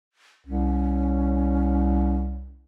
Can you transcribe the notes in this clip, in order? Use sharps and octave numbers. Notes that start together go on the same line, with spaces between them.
C2 C#4